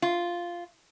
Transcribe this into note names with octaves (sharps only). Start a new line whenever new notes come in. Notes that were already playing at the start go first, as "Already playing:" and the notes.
F4